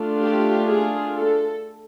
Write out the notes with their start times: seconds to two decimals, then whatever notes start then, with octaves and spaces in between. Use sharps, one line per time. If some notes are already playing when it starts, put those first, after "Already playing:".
Already playing: A3 D4 F4
0.21 G4
0.68 G#4
1.15 A4